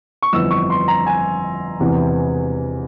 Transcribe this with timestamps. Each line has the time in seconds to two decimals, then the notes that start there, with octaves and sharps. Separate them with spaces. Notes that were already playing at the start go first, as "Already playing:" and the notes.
0.22 C#6
0.32 G1 F2 E3 E6
0.51 C#6
0.70 C6
0.88 A#5
1.06 G#5
1.80 E1 E2 C3 E3